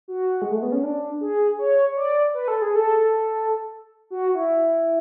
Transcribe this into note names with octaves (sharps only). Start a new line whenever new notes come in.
F#4
G#3
A3
B3
C#4
D4
G#4
C#5
D5
B4
A4
G#4
A4
F#4
E4